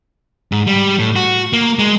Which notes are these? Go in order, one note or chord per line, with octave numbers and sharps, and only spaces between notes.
G#2
G3
A2
F#4
A#3
G#3